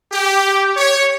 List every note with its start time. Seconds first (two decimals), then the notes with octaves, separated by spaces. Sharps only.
0.12 G4
0.77 C#5